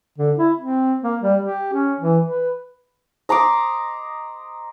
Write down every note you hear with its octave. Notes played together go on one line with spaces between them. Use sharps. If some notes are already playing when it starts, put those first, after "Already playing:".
D3
E4
C4
A#3
G3
G4
C#4
E3
B4
D#5 A#5 C6 D6